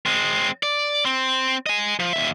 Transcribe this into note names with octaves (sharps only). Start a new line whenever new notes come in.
G#3 C4
D5
C4
D#5 G#5
F3
D#2 E5